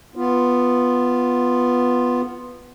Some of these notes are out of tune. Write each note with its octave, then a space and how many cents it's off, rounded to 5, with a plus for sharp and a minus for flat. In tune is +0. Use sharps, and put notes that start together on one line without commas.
B3 +0 F4 +0